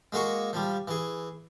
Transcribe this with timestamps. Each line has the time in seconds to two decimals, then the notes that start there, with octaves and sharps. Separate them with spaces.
0.12 G#3 A#3 F#4 G#4 C#6
0.53 F3 G3
0.87 E3 G#4